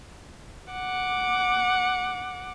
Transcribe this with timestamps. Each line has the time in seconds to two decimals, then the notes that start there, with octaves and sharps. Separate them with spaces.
0.72 F#5 D6